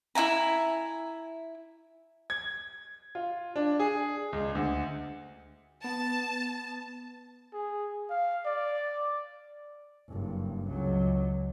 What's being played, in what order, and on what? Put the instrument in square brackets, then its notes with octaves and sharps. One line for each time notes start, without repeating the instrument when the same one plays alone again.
[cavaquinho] E4 E5 G#5 A#5
[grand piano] G#6
F4
D4
G#4
C#2
D2
[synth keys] B3 [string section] A5
[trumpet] G#4
F5
D5
[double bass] F#1 G2
C#2 F#3